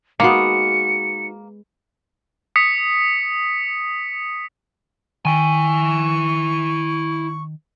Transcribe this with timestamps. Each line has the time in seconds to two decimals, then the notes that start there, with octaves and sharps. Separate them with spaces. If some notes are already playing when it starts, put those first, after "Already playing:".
0.20 G#3 A#3 B3 D#4 F#4 C#7
2.56 D#6 B6 C#7
5.25 D#3 E4 G5 G#5 C#6